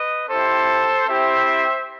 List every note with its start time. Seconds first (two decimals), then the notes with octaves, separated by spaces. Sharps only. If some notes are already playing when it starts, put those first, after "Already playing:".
Already playing: B4 D#5
0.28 C4 E4 G4 A4 C5
1.06 C4 E4 G4 C5 E5